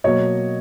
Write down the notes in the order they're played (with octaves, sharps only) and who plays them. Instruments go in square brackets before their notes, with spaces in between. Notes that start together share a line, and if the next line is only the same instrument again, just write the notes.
[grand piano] B2 F#3 A#3 C#5 D#5